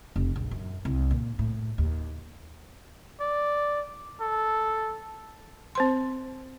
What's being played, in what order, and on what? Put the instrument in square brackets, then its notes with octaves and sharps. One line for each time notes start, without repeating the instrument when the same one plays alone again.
[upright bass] F1
A#1
F#2
C2
A#2
A2
D#2
[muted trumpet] D5
A4
[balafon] C4 C5 C6